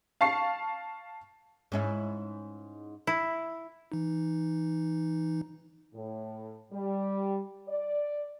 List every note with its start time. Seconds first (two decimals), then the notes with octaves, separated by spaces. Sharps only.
0.21 F5 A5 C#6 C7
1.72 G#2 C#4 E4
3.07 E4
3.92 E3 D#4
5.94 A2
6.72 G3
7.68 D5